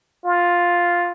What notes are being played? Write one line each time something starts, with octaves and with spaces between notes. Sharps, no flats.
F4